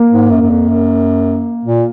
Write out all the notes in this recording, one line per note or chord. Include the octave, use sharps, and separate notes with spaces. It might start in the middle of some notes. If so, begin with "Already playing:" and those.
Already playing: A#3
G#2
F#2
F#2
F2
F#2
A#2